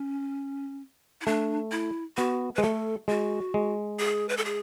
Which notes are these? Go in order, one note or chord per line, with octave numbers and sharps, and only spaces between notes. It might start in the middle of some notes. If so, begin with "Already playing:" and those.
Already playing: C#4
E4
A3 D4
E4
B3 F#4
B4
G#3
A3 A4
G#3 F#4
G#3
G#4
B4
A4
G#4